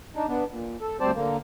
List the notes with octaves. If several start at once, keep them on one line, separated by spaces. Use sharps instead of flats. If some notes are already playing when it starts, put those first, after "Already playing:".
D4 D#4
B3 D4
A#2
A4
D2 G3 C4 C5 D5 A5
D3 A#3